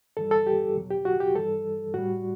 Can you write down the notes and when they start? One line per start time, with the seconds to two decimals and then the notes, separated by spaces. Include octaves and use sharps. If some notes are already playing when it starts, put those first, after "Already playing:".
0.17 G2 E3 G3 A4
0.31 A4
0.47 G4
0.75 E2 B2 F#3
0.91 G4
1.05 F#4
1.20 G4
1.35 G2 E3 G3 A4
1.94 A2 G3 F#4